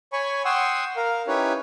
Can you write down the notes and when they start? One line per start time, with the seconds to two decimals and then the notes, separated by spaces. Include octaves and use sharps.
0.13 C#5 G#5 B5 C#6
0.45 F#5 G5 C6 C#6 D#6 E6
0.96 A#4 F5
1.27 C#4 D#4 E4 G4 B4 C#5